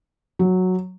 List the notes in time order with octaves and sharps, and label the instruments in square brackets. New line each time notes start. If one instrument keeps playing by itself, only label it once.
[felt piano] F#3